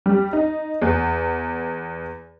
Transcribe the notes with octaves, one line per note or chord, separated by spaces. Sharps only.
G3
D#4
E2